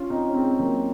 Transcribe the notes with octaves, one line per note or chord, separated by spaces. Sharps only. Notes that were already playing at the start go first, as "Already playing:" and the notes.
Already playing: C#4 F4
C4 D#4
C#4
G#3 C4
C4
F#3 A#3